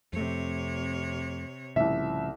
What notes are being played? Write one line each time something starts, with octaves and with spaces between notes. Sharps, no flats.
F2 C3 A3 C#5
C2 A2 C#3 F3 E5